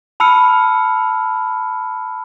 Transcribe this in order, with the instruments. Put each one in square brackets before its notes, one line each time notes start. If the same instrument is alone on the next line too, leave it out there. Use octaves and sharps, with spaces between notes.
[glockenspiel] A5 B5 E6 F6 C#7